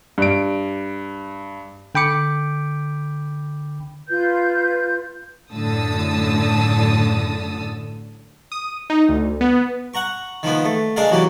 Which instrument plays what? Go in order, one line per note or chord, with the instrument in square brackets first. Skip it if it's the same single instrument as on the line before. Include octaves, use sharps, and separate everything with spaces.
[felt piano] G2 D7
[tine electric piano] D3 G5 B5 D6 C#7
[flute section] F4 B4 G6
[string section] F#2 A2 D3 A5 D#6 E6
[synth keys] D#6
D#4
D2
B3
[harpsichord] F#5 A#5 C#6
D#3 F3 A#3 B3
A3
G#3 D4 G#4 A#4 F5
E3 F#3 G3 A#3